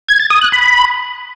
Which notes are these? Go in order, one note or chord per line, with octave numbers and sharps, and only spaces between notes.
G#6
A6
D#6
F#6
B5